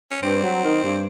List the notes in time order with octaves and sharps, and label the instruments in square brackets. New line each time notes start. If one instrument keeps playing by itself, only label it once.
[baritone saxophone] C#4
[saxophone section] G2 [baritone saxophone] C4
[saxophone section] F#3
D#3
G2